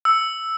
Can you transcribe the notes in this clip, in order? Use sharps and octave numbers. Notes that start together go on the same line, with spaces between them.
E6